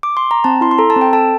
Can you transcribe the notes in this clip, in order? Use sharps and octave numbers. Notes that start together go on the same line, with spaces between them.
D6
C6
A#5
C4 A5
E4 C6
C6
A4 A#5
A5
C4
G5
A4 A5